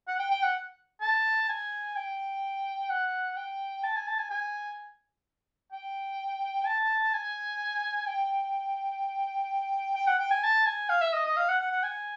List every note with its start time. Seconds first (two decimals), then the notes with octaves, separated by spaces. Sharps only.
0.08 F#5
0.19 G5
0.31 G5
0.43 F#5
1.01 A5
1.49 G#5
1.96 G5
2.90 F#5
3.37 G5
3.84 A5
3.96 G#5
4.07 A5
4.19 G#5
4.31 G#5
5.72 G5
6.66 A5
7.14 G#5
8.08 G5
9.96 G5
10.07 F#5
10.19 G5
10.31 G#5
10.43 A5
10.66 G#5
10.89 F5
11.01 E5
11.13 D#5
11.26 D#5
11.37 F5
11.49 F#5
11.61 F#5
11.72 F#5
11.84 G#5